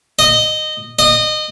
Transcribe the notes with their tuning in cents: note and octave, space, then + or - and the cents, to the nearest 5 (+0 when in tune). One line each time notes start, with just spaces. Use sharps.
D#5 -15
D#5 -25